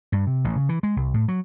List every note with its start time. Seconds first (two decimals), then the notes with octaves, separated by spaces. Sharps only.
0.12 G2
0.27 C3
0.44 A1
0.56 C#3
0.69 E3
0.83 G#3
0.96 C2
1.14 A2
1.28 F#3